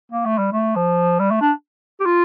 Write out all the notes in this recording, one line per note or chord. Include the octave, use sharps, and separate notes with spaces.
A#3
A3
G3
A3
F3
G3
A3
D4
G4
F4